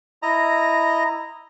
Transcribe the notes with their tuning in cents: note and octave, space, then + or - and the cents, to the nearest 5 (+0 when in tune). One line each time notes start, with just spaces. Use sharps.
E4 +0 D#5 +0 A#5 -5